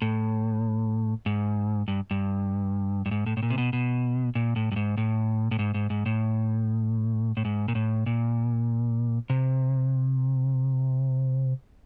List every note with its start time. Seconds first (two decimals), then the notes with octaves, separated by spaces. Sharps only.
0.02 A2
1.26 G#2
1.88 G2
2.11 G2
3.06 G2
3.11 G#2
3.26 A2
3.37 A2
3.43 A#2
3.50 C3
3.58 B2
3.73 B2
4.35 A#2
4.56 A2
4.72 G2
4.76 G#2
4.97 A2
5.51 A2
5.59 G#2
5.74 G#2
5.90 G#2
6.06 A2
7.37 A2
7.45 G#2
7.68 A#2
7.75 A2
8.06 A#2
9.30 C3